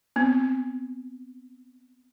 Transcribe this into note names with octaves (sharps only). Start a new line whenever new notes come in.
B3 C4